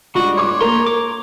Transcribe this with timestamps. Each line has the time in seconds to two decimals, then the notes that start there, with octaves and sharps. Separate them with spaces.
0.15 G3 G#3 D4 F4 F#4
0.37 C#5 C6 D6
0.61 A#3 A#4 A#5 C6
0.87 A#5 D6